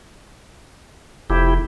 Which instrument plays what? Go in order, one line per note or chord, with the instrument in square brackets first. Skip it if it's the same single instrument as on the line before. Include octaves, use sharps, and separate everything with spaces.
[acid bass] F1 [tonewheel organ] E4 G4